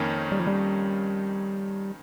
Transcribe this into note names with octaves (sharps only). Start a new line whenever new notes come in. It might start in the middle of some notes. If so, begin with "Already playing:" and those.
Already playing: F2 D#3 A#3 C#4
G3
F3
G3